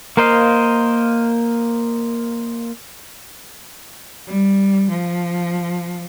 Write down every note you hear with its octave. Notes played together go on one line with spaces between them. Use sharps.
A#3 A#4 C5 D#5 F5
G3
F3